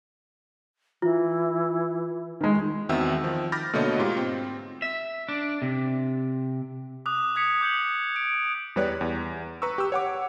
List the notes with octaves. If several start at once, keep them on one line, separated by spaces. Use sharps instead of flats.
E3 F4
D#3 G#3
E2 D#3 C4 F#4 E5 E6
D#3 F3
B5 D6 F6 G6 A6 A#6
B2 D3 A3 A#3 C#5 D#5
G#2 F4 G4
C4
E5
D4
C3
D6 D#6 F#6
D6 D#6 G#6 B6 C#7
D6 G6 C#7 F#7
D7
E2 G3 B4 C#5 D5 F#6
E2
B4 A#5 C#6 E6
G4 E6
C#5 F#5 D6